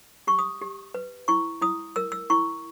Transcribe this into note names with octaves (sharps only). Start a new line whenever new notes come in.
G4 C#6
D#6
G4
B4
E4 C#6
E4 D#6
A#4 E6
E6
E4 C#6